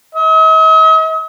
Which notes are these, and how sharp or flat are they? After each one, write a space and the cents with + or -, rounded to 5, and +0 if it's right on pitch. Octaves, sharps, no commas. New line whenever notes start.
D#5 +45